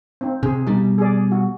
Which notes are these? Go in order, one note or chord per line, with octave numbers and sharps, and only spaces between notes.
C4 D#4
C3 G#4
B2 G3 D#4
G#4 D5
F#4